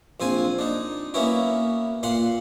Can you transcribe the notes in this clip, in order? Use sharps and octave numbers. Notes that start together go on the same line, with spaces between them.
A#1 C4 F4 G#5
D4 D#4
A#3 B3 C#4 E4 F#4
A#2 F5 F#5 C6